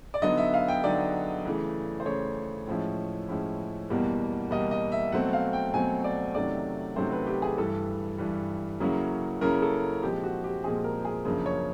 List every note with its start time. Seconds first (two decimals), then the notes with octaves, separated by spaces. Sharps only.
0.14 D5
0.22 D3 F#3 B3 D#4 D#5
0.38 E5
0.54 F5
0.68 G5
0.83 D3 F#3 B3 D#4 D5
1.45 C#3 E3 A3
2.00 C5
2.06 C#3 E3 A3 C#5
2.67 A2 F3 G#3 C#4 E4
3.29 A2 F3 G#3 C#4 E4
3.90 E2 B2 G3 A#3
4.51 E2 B2 G3 A#3 D#5
4.71 D#5
4.92 E5
5.12 B2 F#3 A3 C4 F#5
5.33 F5
5.53 G5
5.74 B2 F#3 A3 C4 G#5
6.04 D5
6.35 C3 D#3 F#3 A3 C#4 D5
6.96 C3 D#3 F#3 A3 C#4 C5
7.12 B4
7.27 G4
7.42 G#4
7.57 G2 E3 G3 A4
8.18 G2 E3 G3
8.80 C#3 F#3 A#3 C#4 E4
9.41 C#3 F#3 A#3 C#4 E4 A#4
9.62 A4
10.03 A#2 F3 G#3 C4 G4
10.24 F#4
10.44 G4
10.64 A#2 F3 G#3 C4 G#4
10.84 A#4
11.05 G#4
11.25 F#2 C#3 F3 A#3 D4
11.46 C#5